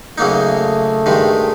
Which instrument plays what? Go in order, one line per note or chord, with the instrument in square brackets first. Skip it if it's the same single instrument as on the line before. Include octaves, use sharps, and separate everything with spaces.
[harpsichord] C#3 F#3 A#3 D#4 [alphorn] A3
[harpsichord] G2 D#3 G#3